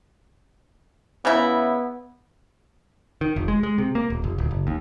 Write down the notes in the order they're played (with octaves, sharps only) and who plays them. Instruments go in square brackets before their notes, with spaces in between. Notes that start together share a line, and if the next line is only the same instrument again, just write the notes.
[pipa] C#3 C#4 E4 [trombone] B3
[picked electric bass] D#3
F1
G#3
G#3
C3
A#3
D#1
F1
D1
F#1
D#2